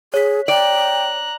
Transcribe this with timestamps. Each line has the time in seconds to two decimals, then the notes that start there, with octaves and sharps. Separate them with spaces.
0.14 G#4 C#5 B6
0.48 D5 G5 A#5 F#6